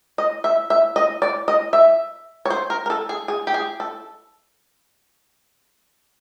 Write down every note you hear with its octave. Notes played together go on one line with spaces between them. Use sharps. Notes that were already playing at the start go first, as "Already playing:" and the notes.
D#5
E5
E5
D#5
D5
D#5
E5
C#5
C5
A#4
A#4
A4
G#4
G#4
G4
G#4
A4